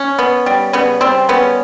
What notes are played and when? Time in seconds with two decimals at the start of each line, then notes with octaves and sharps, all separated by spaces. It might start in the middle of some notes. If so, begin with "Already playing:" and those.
Already playing: C#4
0.19 B3
0.46 G3
0.73 C#3 B3
1.01 G3 C4
1.29 C#3 B3 C#4